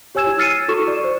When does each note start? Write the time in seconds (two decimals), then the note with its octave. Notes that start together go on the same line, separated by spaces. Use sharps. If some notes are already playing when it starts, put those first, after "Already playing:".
0.15 G4 C#5 G#5 E6 G#6 E7
0.27 E4
0.39 E6 F6 A6 C7 C#7 D#7
0.68 E4 F#4 A4 C#6 E7
0.88 D5
1.04 C5